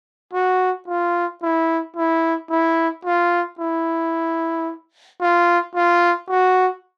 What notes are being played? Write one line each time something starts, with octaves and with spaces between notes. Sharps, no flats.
F#4
F4
E4
E4
E4
F4
E4
F4
F4
F#4